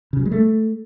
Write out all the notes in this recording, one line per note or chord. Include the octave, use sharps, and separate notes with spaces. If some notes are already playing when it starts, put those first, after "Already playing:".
C#3
F#3
G#3
A3